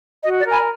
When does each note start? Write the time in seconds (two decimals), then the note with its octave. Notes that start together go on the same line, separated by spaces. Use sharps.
0.24 F#4 D#5
0.38 D5
0.46 A#4
0.52 G#5 B5